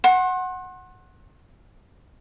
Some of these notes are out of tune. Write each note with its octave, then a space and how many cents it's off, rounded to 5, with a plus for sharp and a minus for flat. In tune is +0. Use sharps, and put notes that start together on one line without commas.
F#5 +0 C6 +40